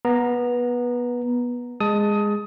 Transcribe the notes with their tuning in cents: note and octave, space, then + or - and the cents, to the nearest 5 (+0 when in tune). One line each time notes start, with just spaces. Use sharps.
B3 -20 A#5 +0
G#3 -10 A5 +0 D#6 +20